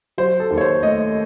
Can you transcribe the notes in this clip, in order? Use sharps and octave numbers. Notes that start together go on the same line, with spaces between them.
F#3 C5
A4
D#2
C#5
C5
A3 D#5